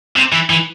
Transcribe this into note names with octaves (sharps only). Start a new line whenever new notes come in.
C3
E3
E3